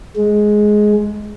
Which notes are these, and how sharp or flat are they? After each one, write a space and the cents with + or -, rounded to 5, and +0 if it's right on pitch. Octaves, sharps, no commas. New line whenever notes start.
G#3 +10